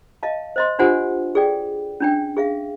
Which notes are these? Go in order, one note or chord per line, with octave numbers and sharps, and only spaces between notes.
D#5 F5 A5
C5 D#5 C6
D4 F4 G4 C5 F#5 G#5
G#4 A4 D5 G5
C#4 D4 G5
G#4 E5 F5